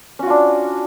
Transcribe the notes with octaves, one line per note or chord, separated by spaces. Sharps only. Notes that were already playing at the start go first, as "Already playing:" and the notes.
C#4 D4 F4 F#4